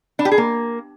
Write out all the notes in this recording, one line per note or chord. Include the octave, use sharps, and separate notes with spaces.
D4
G4
G#4
A#3